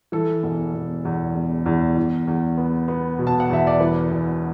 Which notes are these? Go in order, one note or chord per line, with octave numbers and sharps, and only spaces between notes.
E3 A4
E1
E1
E2
E1
E2
E2
E2
B3
B3
B2
A5
F#5
E2 E5
D5
E3 B4
E1